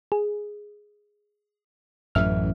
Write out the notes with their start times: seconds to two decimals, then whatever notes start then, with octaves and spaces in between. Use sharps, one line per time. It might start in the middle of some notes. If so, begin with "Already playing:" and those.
0.12 G#4
2.15 A1 F#2 E3 E5 F6